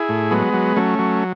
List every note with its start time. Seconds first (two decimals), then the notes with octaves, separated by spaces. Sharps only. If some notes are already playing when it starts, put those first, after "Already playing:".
Already playing: E4 G#4
0.09 A2
0.31 F#3 G#3 B3
0.54 F#3
0.76 F#3 A3 C#4
0.99 F#3